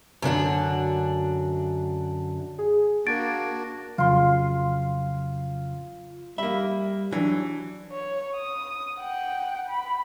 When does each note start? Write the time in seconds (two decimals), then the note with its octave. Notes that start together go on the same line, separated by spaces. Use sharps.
0.22 F#2 D3 D4 F#4
2.58 G#4
3.07 A#3 D4 F#4 G#6 A6 D7
3.98 F2 C#3 F#3 F4 C6
6.38 G3 A#3 E5 B5
7.12 E3 F#3 D4
7.92 C#5
8.37 D#6
8.99 F#5 G5
9.69 B5